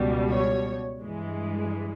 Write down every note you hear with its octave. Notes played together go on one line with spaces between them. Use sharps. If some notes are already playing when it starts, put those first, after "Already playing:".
Already playing: C#2 B2 G3
C#5
G2 E3 G#3